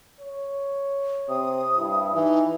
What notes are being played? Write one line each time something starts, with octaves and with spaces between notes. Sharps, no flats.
C#5
C3 D#6
G2 E4
E3 D#4